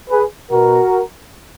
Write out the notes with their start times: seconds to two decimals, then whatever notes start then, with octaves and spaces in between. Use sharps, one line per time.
0.10 G#4 B4
0.51 B2 F#4 A#4